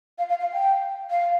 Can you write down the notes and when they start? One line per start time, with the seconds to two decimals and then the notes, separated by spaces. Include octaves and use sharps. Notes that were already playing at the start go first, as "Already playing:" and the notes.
0.18 F5
0.29 F5
0.40 F5
0.52 G5
1.10 F5